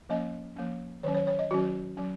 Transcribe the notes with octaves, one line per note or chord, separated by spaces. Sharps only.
F3 A#3 C#4 D#5
F3 A#3 C#4
D#3 F#3 C#4 C#5
C#5
C#5
D#5
D#3 F#3 C#4 F#4
F#3 C#4